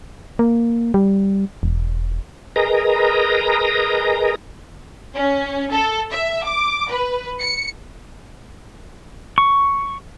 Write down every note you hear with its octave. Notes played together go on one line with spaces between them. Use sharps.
A#3
G3
E1
G#4 A#4 B4 D#5 A#5
C#4
A4
E5
D6
B4
C#7
C#6